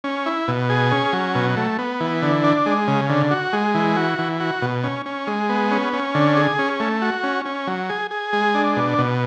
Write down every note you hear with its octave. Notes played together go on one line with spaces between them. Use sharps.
C#4
E4
B2
G#4
C#4
F#3
B2
A3
B3
E3
D3
D4
G#3
C#3
D3
F#4
G#3
E3
F#4
E3
F#4
B2
C#4
C#4
G#3
B3
C#4
C#4
D3
G#4
C#4
A3
F#4
C#4
C#4
F#3
G#4
G#4
G#3
D4
B2
B2